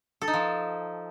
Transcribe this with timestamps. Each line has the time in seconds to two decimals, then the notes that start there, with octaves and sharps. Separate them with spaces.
0.22 A4
0.28 D#4
0.34 F3